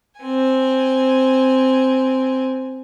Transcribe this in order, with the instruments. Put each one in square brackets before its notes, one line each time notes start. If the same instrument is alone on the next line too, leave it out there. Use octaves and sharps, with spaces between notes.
[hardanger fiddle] C4 G#5